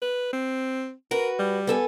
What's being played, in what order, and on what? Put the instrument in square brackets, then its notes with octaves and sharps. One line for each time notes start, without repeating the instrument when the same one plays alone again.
[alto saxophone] B4
C4
[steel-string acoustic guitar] F#4 B4 [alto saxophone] A#4
[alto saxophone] G3
[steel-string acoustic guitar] B3 A4 G#5